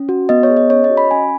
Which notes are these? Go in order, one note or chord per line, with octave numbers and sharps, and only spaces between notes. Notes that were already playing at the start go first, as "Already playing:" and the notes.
Already playing: C#4
F#4
B3 D#5
C#5
G#4
D#5
C#4 C#5
D#5
F#4
B5
C#4 G#5